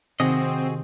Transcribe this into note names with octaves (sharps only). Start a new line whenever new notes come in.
C3 D#3 C4 F#4 G#4 D#5